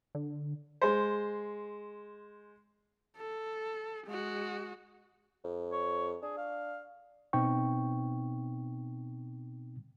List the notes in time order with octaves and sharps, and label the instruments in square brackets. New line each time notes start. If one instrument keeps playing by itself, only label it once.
[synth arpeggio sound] D3
[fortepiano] G#3 C5
[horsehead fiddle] A4
G#3 F#4
[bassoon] F2
[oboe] C#5
[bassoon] D4 [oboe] G#4
[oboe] F5
[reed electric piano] B2 B3 C4 D#4 G5 C#6